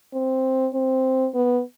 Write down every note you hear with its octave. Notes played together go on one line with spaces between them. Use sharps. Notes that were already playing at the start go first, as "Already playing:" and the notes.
C4
C4
B3